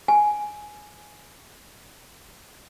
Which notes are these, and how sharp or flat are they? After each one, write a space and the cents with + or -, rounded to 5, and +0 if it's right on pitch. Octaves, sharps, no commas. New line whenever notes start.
G#5 +5